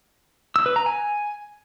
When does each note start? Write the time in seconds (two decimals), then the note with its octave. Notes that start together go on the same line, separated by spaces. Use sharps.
0.56 E6
0.66 B4
0.76 A#5
0.86 G#5